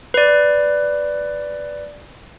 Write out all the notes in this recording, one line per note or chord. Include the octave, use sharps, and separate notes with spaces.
B4 D5